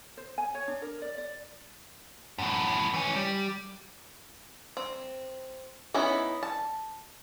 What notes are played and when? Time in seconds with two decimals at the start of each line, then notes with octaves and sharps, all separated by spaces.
0.17 C5
0.38 G#5
0.55 C#5
0.68 D4
0.82 A#4
1.02 D5
1.18 D5
2.38 F#2 A2
2.94 E3 C#4
3.16 G3
4.77 C4
5.94 B3 C#4 D#4 E4
6.43 A5